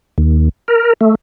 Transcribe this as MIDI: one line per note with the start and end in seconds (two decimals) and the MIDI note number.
0.18 0.49 39
0.68 0.93 70
1.01 1.15 57